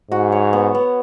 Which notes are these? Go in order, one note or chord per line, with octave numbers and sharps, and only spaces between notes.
G#2 F#4
C#5
B3
B3